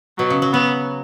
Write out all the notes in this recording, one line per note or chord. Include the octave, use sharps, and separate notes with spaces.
B2 F#3
C#3
F#3
F#3 B3